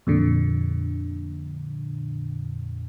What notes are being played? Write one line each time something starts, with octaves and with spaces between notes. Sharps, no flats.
F2 A#2 D3